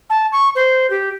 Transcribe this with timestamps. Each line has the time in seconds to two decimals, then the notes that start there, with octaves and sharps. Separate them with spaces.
0.10 A5
0.32 C#6
0.55 C5
0.90 G4